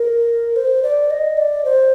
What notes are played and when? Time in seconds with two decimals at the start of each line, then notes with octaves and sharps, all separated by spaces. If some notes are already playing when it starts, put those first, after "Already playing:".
Already playing: A#4
0.56 C5
0.83 D5
1.10 D#5
1.37 D5
1.65 C5